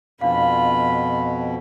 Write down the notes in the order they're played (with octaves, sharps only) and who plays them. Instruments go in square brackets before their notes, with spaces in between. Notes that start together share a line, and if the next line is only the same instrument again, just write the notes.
[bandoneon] F2 B2 [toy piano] D4 F5 [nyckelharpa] F4 B5